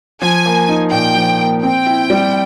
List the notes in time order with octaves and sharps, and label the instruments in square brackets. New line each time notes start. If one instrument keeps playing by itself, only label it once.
[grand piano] F3 [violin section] G#5
[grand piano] A#3
D#4
[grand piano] A#2 [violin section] G5
[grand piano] F3
A#3
[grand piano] C4 [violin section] G5
[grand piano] E4
G3